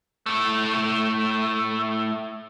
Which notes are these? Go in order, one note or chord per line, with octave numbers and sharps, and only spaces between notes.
A2 A3